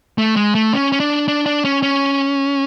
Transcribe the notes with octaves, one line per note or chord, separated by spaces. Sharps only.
A3
G#3
A3
C#4
C#4
D4
D4
D4
C#4
C#4